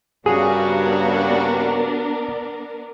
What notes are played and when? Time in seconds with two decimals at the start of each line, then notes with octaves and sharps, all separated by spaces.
0.26 G2 C#3 B3 D4 F#4 G#4 A#4